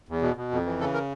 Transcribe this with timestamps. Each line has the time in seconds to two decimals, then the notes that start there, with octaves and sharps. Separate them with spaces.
0.09 E2
0.22 B2
0.36 B2
0.51 F2
0.65 E3
0.80 C#3 A4
0.94 A#4